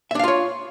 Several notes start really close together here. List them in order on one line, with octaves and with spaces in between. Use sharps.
E5 D4 F5 F4 C#5